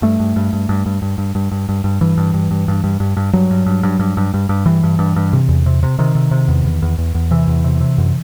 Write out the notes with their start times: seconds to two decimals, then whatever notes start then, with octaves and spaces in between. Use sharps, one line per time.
0.02 G2 A3
0.20 G2
0.36 G2
0.53 G2
0.69 G2
0.86 G2
1.02 G2
1.18 G2
1.35 G2
1.52 G2
1.69 G2
1.84 G2
2.01 G2 E3
2.17 G2
2.34 G2
2.51 G2
2.68 G2
2.84 G2
3.00 G2
3.17 G2
3.33 G2 F#3
3.51 G2
3.66 G2
3.83 G2
3.99 G2
4.17 G2
4.34 G2
4.49 G2
4.66 G2 E3
4.83 G2
4.99 G2
5.16 G2
5.33 C3
5.49 E2
5.66 C3
5.83 C3
5.99 C3 D#3
6.15 C3
6.31 C3
6.48 E2
6.64 E2
6.82 E2
6.98 E2
7.15 E2
7.31 C3 E3
7.47 E2
7.64 C3
7.81 C3
7.98 F#2